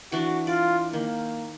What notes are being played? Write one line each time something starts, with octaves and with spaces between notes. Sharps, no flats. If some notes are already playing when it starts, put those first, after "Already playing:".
E3 D4 F#4
F4 D5
D#3 A#3